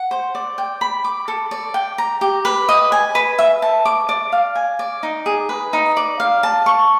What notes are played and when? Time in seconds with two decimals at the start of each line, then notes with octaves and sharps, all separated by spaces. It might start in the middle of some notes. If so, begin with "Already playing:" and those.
Already playing: F#5
0.11 C5
0.35 D5
0.58 G5
0.81 B5
1.04 D6
1.28 A4
1.51 D5
1.74 G5
1.98 A#5
2.21 G4
2.45 B4
2.69 D#5
2.92 G#5
3.15 B4
3.39 E5
3.62 A5
3.85 D6
4.09 D5
4.32 F5
4.55 G#5
4.79 D5
5.03 D#4
5.26 G#4
5.49 B4
5.73 D#4
5.97 D5
6.20 F5
6.43 A5
6.66 C#6